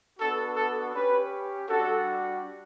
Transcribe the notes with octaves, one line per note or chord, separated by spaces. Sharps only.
B3 D4 F#4 A4
A4
C#4 G4 B4
G3 D4 F#4 A4